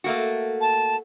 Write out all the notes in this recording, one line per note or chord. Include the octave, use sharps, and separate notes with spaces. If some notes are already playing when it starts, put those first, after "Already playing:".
A3 A#3 F#4
A5